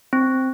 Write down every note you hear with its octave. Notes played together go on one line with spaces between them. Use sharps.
C4